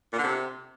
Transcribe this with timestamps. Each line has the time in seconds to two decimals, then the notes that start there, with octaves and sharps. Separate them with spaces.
0.13 A#2
0.18 D3
0.24 C3